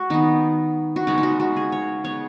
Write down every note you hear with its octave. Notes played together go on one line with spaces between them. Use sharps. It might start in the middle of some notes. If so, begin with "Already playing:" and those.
Already playing: G#3 F#4
D#3 B3 D#4
F#4
C#3 G#3 B3 D#4
D#4
F#4
F#4
G#4
C#5
C#3 B3 C#5